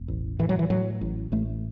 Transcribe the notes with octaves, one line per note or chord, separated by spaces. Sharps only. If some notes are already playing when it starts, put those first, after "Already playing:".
Already playing: E1
A1
A2 E3
F#3
E3
A2 F#3
A1
A1 A3